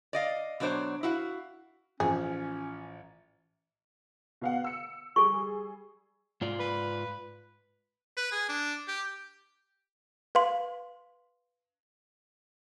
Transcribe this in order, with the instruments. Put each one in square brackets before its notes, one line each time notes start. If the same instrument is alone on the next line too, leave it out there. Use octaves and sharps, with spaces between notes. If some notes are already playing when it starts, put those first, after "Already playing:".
[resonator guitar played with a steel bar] D5 D#5 F5
B2 F#3 D4 D#4 C5 C#5
E4 F#4 F5
[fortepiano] A1 F3 [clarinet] C#4 [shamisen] G#4
[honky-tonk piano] B2 F5 F#5
E6 C#7
[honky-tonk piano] G3 G#4 [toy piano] A4 C#6
[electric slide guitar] G#2 F4 D5
[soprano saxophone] B4
[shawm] B4
G#4
D4
G4
[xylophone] B4 F5 C6